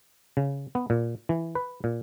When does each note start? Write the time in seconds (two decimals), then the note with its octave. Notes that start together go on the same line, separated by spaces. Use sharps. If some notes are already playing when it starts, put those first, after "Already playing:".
0.37 C#3
0.75 B3
0.90 A#2
1.29 E3
1.55 B4
1.84 A#2